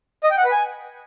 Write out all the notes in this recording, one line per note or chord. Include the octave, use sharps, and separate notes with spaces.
D#5
G5
F#5
B4
G#5